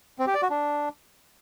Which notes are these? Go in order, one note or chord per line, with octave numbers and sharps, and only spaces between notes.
C4
G4
D5
F#4
D4